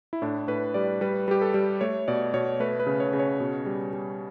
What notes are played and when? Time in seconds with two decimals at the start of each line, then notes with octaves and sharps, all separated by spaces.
0.13 E4
0.22 A2 D4
0.48 A2 B4
0.74 G3 D5
1.01 G3 B4
1.28 G3 G4
1.42 A4
1.54 G3
1.81 A3 C#5
2.08 B2 D5
2.34 B2 C#5
2.60 A3 B4
2.80 B4
2.87 C#3
3.00 C#5
3.13 C#3
3.19 C#5
3.40 B2
3.66 G3
3.93 G3